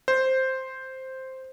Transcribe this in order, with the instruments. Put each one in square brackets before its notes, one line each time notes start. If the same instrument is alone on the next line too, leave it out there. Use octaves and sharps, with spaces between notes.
[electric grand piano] C5